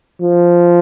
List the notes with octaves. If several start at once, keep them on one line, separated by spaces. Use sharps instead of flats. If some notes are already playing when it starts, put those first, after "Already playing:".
F3